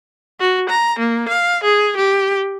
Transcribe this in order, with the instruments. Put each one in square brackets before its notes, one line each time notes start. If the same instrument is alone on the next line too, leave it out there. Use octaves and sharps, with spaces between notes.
[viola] F#4
A#5
A#3
F5
G#4
G4